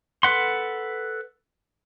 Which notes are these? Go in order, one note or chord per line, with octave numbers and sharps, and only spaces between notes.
A4 B4 F#5 C6